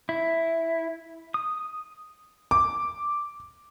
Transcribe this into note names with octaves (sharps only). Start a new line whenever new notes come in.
E4
D#6
D6